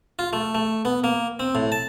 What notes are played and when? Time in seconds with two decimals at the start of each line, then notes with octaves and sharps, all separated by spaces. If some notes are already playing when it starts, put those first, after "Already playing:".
0.19 F4
0.33 A3
0.55 A3
0.85 B3
1.04 A#3
1.39 C4
1.55 A2
1.72 A5